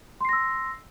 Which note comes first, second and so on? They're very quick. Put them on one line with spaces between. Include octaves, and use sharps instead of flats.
C6 C7 A#6 E6